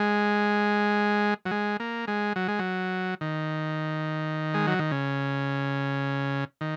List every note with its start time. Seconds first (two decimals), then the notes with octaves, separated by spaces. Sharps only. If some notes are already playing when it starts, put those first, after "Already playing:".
Already playing: G#3
1.45 F#3
1.51 G#3
1.80 A#3
2.07 G#3
2.36 F#3
2.48 G#3
2.59 F#3
3.21 D#3
4.54 G#3
4.67 F#3
4.79 D#3
4.91 C#3
6.61 D#3